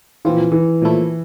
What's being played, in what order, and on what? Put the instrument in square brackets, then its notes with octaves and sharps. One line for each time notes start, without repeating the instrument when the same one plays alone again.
[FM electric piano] A#2 F3 C4 F4 [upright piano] E3
[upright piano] E3
[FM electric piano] A#2 F3 A3 E4